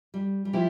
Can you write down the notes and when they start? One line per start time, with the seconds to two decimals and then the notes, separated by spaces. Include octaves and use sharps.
0.14 G3
0.45 G3
0.53 F3 E4 G4